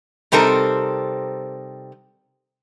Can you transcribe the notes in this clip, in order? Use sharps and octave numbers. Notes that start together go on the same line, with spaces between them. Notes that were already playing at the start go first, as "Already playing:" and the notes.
C3 G3 C4 D#4 A4 A#4